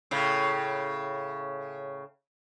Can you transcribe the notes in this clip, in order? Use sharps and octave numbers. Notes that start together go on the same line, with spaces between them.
A2 C#3